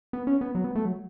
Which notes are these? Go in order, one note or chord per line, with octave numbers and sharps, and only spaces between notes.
B3
C#4
B3
F#3
B3
A3
F#3